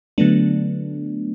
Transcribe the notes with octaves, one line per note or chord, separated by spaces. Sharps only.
D3 F#3 A3 B3 D4